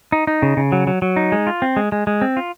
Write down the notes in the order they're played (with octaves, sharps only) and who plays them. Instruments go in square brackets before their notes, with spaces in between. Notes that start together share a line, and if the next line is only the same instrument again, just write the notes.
[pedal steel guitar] D#4
D#4
C#3
C#3
F#3
F#3
F#3
D#4
G#3
F4
C4
G#3
G#3
G#3
C4
F4